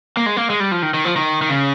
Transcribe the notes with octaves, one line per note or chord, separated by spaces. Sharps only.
A#3
G#3
A#3
G#3
G3
F3
D#3
D#3
F3
D#3
D#3
C#3